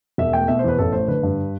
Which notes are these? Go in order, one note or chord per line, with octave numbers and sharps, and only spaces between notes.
E1 E5
A3 G5
B2 E5
C5
E2 B4
A1 A4
A3 C5
D3 B4
G2